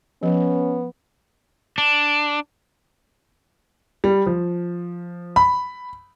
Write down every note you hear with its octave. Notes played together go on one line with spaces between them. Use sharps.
F3 B3 C#4
D4
G3
F3
B5